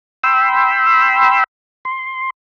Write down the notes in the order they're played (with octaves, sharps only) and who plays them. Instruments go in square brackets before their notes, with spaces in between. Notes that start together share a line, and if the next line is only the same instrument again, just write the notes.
[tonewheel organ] G5 B5 C6 E6
C6